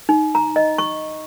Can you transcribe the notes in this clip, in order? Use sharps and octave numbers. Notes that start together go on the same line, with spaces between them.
D#4
A#5
D#5
C#6